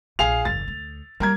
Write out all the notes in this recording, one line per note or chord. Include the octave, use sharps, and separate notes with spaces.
A#1 G#4 F5 F7
F#1 E2 A6
D2
G3 A#3 A#4 G#6